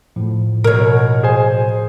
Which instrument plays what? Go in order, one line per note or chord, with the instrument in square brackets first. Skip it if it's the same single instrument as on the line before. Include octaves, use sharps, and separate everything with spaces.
[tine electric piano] A2 F3
[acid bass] B2 [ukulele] A#4 C#5
[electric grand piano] G#4 C5 G#5